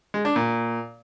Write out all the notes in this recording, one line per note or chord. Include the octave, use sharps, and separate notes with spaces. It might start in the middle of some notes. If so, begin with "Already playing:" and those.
G#3
D4
A#2